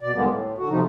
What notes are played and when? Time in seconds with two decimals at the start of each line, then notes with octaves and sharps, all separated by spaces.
0.01 B2 D5
0.14 D#2 D3 G3 G#3 A#3 B3
0.28 A2
0.58 D3 F#4
0.69 E2 C3 F3 G3 D#4